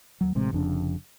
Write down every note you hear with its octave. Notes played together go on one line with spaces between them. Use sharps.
D#2 F#3
A1 A2 C3 G#3
F1 F2 C#3 D4